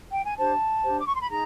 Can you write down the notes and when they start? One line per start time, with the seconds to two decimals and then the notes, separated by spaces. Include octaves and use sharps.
0.12 G5
0.24 G#5
0.37 D4 G4 C5 A5
0.84 D4 G4 C5
0.99 D6
1.07 C#6
1.14 C6
1.21 B5
1.29 D#4 G#4 A#5